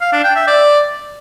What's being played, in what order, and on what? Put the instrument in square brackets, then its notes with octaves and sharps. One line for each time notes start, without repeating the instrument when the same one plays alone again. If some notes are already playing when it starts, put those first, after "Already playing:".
[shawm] F5
D4
G5
E5
D5